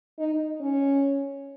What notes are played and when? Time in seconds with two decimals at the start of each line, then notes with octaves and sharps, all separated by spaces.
0.19 D#4
0.61 C#4